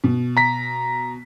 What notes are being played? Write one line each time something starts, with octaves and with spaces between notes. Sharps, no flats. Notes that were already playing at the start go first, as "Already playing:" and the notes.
B2
A#5 B6